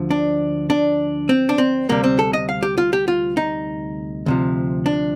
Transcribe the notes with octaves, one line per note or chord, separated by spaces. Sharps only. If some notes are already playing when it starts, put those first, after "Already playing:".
Already playing: D2 D3 F3
D4
D4
C4
D4
C4
D2 C3 G3 A#3
C4
A4
D#5
F5
G4
F4
G4
F4
D#4
D2 C3 F3
D4